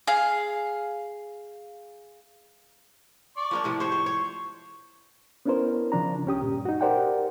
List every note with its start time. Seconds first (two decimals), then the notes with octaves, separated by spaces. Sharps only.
0.07 G#4 F5
3.37 D5 C#6
3.51 F3 A#3 D4
3.64 A2 C3 F3
3.80 C5 C#5 C#6
3.92 C5
4.06 C#5
5.46 B3 C#4 D4 E4 A#4 C5
5.92 C#3 F3 D4 A#5
6.26 C#2 C#4 G4 D#6
6.42 G2 A#2
6.65 D#4 F#4
6.81 G4 A#4 C5 D5 F#5 G5